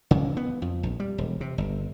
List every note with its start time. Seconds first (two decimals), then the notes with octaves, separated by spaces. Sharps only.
0.11 C#3
0.37 B3
0.62 F2
0.83 A#1
1.00 G3
1.18 E1
1.41 C3
1.58 G1